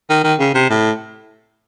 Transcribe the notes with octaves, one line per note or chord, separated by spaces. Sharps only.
D#3
D#3
C#3
C3
A2